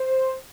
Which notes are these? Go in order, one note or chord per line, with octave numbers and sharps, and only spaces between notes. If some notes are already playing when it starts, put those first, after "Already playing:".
Already playing: C5